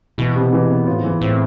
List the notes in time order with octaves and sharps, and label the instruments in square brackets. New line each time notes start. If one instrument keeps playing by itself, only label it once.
[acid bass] B2 [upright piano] E3
[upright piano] C3
E3
B3
[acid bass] A2 [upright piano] F4
[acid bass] G#2
[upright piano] E3
[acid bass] A2 [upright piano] C4